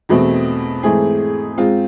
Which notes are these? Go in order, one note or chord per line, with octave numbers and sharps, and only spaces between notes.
E2 B2 A3 C4
G#2 E3 A3 C4 G#4
G#2 G#3 C4 F4